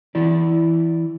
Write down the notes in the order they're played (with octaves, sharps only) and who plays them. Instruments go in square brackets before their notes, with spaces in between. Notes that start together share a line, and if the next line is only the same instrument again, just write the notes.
[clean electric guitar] E3 E4 D5